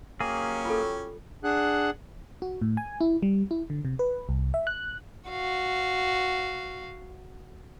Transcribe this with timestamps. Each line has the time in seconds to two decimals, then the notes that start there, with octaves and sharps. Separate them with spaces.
0.20 F#3 A#3 C#4 G4 G#4
0.65 F4 A4
1.44 D4 G#4 F#5 F#6
2.42 F#4
2.62 A2
2.77 G#5
3.01 E4
3.23 G3
3.51 E4
3.70 D3
3.85 C3
3.99 B4
4.29 C2
4.54 E5
4.67 F#6
5.30 F#4 F5